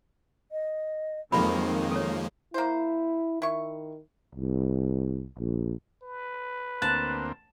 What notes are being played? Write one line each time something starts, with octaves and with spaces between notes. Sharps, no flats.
D#5
F2 D#3 F3 F#3 G#3 A#3 C4 B5
A4 C#5
A#3 E4 C5
D#3 E4 C#6
C2
A#1
B4
D2 A#3 C4 A5 F#6